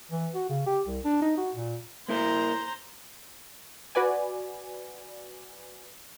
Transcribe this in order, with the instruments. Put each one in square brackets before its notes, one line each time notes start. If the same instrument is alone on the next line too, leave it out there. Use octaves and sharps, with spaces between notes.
[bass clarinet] E3
F#4
C#3
G4
C2
D4
D#4
F#4
A#2
[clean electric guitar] A#3 E4 A#4 [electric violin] C5 A#5
[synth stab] F#4 B4 D5 G#5